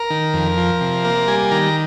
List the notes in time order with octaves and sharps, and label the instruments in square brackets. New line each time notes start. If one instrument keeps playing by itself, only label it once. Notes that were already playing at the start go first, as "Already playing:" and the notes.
Already playing: [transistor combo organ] A#4
D#3
F2
F3
C3
A#3
G3 G#5
D#3 A#5